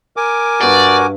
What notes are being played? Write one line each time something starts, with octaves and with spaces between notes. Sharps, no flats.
A#4 G#5 D6
G2 F#4 B4 D5